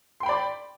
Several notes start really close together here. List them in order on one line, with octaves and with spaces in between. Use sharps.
C6 G5 B5 D5